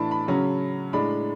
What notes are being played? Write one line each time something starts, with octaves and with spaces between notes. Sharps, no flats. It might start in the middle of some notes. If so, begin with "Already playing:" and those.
Already playing: A2 E3 A3 D4 A5 B5
B5
C#3 F#3 C#4
A2 G#3 D4 B5